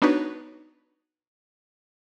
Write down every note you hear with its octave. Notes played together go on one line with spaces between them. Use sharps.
B3 D4 D#4 F#4 B4 C#5